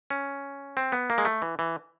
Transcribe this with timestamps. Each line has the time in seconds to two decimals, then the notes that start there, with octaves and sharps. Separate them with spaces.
0.10 C#4
0.77 C4
0.92 B3
1.10 A#3
1.18 G#3
1.25 A3
1.42 E3
1.59 E3